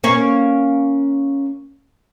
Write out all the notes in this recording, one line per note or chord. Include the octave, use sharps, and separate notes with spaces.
A#3 C#4 C#5